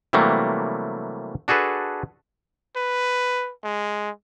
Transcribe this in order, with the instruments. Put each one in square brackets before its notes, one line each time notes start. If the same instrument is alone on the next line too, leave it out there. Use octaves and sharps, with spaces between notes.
[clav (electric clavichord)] C3 E3 F#3 G3 A3 A#3
D4 F#4 G#4 A4 B4
[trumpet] B4
G#3